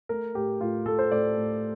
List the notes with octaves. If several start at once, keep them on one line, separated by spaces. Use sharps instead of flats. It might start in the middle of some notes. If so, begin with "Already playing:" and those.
A3 A#4
A2 G4
A2 F4
A3 A4
C5
A2 D5
A2